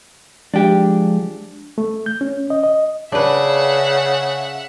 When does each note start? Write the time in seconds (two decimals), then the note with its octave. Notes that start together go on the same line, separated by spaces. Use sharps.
0.54 F3 G#3 D4 G4
1.78 A3
2.06 G6
2.21 C#4
2.50 D#5
2.64 D#5
3.12 C#3 D4 B4 E5 F#5